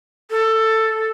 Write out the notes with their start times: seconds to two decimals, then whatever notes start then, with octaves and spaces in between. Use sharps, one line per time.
0.31 A4